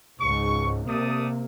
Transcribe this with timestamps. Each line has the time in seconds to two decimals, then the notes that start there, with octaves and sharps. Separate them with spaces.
0.20 C#2 G#2 C#6
0.87 C3 A3 A#3 D5 D#6